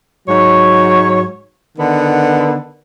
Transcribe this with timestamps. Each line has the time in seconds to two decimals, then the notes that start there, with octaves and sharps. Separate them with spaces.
0.28 G#2 F#3 C#5
1.78 D3 D#3 B3